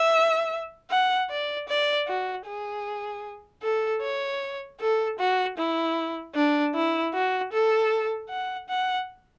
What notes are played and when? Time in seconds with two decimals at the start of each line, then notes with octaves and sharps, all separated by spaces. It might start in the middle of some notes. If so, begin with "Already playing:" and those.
Already playing: E5
0.91 F#5
1.30 D5
1.68 D5
2.08 F#4
2.46 G#4
3.62 A4
4.02 C#5
4.80 A4
5.19 F#4
5.58 E4
6.35 D4
6.74 E4
7.14 F#4
7.52 A4
8.30 F#5
8.69 F#5